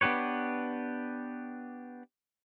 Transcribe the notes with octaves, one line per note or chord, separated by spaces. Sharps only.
B3 D4 G4 B4 C#5